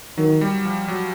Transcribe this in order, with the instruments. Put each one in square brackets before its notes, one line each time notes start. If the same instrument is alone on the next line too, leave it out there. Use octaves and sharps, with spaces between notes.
[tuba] D#3 [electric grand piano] F#3
[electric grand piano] G3
F3
F#3